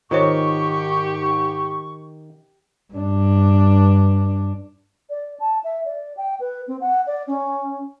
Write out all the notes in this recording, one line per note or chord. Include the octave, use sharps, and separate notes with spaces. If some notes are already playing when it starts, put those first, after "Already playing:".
G#2 D#3 F4 G4 C5 C#5 C#6
G2 D4
D5
A5
E5
D5
G5
B4
C4
F#5
D5
C#4